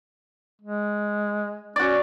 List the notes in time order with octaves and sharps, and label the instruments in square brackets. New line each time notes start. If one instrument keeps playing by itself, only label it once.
[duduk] G#3
[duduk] C#4 [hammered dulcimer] F#4 D5